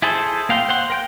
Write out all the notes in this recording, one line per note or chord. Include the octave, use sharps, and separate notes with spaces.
E4 G#4 A4 C5
A#3 F5 G5 C6
C5 F#5 C6
A#4 G5 G6